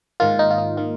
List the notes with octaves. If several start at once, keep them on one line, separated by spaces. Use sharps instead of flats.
G#2 D#3 A#3 F4
D#4
F4
D#4
D#3 A#3 F4